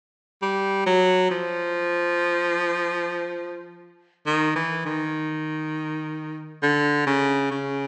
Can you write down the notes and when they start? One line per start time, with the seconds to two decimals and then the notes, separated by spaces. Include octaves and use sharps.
0.42 G3
0.86 F#3
1.31 F3
4.26 D#3
4.56 E3
4.86 D#3
6.63 D3
7.07 C#3
7.51 C#3